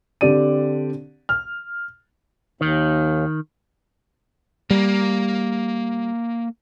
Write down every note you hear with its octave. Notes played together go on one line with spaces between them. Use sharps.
D3 C4 D4 G4 D5 D#7
F6
D#2 D#3
G3 A#3